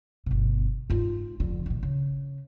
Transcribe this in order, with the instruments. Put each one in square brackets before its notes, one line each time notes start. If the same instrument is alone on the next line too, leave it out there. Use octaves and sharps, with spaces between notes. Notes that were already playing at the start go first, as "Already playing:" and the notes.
[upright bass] G1 B2
G#2 F4
F2 D3
A#2 D#3
C#3